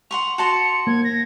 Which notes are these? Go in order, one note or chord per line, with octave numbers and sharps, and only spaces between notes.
F#5 C6 C#6 F7
F#4 A5 C6 C#7
A#3 G#6
A#6